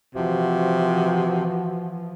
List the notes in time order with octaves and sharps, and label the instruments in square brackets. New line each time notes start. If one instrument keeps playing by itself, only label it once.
[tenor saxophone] C3 [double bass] E3 F3 [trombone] F#4